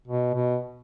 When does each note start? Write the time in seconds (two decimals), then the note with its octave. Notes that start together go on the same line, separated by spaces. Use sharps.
0.08 B2
0.34 B2